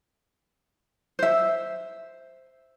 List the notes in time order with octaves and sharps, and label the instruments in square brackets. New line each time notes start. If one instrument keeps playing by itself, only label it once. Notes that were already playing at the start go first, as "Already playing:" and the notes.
[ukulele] C5 E5